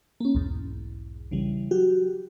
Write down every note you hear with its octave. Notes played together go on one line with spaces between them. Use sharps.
A#3 C#4
B1 E2 G#2
C#3 E3 G3
F#3 F#4 G4